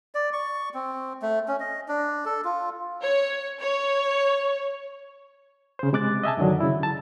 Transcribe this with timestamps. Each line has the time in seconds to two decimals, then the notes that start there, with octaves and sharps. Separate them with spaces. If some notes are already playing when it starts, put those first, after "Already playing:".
0.15 D5
0.33 C#6
0.74 C4
1.22 A3
1.48 C#4
1.60 D#5
1.88 D4
2.26 A4
2.45 F4
3.04 C#5
3.61 C#5
5.79 C#3 C5
5.93 C3 G#3 D6 F#6 A6
6.23 D#5 E5 G#5 A5
6.37 F#2 D3 D#3 F#3 D4
6.61 C#3 E4
6.83 A5